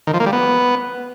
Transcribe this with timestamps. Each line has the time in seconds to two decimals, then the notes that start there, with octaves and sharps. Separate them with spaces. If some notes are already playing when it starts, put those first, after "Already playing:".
0.07 D#3
0.14 F3
0.20 A#3
0.26 G3
0.33 B3